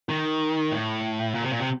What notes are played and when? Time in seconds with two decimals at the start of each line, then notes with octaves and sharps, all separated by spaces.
0.09 D#3
0.72 A2
1.35 A#2
1.42 C3
1.51 A#2
1.60 C3